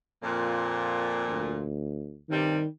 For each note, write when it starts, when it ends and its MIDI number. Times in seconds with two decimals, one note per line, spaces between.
0.22 1.62 41
0.22 1.62 46
1.27 2.19 38
2.29 2.58 43
2.29 2.58 48
2.29 2.67 51
2.29 2.58 55